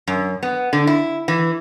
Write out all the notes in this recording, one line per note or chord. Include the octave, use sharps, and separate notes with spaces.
F#2
B3
D3
E4
E3